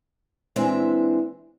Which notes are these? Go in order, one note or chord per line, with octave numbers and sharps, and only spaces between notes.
A#2 E3 G#3 C4 D4 E5